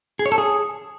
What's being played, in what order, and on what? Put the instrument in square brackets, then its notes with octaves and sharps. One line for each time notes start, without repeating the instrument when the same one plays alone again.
[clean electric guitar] G#4
C#5
A4
G#4